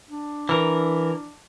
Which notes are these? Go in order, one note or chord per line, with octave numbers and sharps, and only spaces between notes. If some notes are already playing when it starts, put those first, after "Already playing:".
D4
E3 A#4